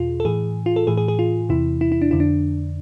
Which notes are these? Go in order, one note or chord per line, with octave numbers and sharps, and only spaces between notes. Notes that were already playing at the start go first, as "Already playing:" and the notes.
Already playing: E2 B2 F4 G#4
A4
A2 E3 G#4
F4
A4
A2 E3 G#4
G#4
G#4
F4
E2 C3 E3 E4
E4
E4
D4
F2 D3 E4
D4